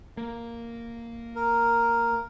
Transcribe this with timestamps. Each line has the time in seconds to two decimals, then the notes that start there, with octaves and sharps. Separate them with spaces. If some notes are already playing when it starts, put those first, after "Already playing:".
0.17 A#3
1.36 A#4